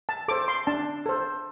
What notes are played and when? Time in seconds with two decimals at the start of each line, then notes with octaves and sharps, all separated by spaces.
0.09 A5
0.28 A4 C5 D6
0.48 C6
0.67 D4 A5
1.06 A4 C5